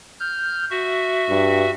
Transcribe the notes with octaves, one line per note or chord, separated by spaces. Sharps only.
F6 G6
F#4 E5
G2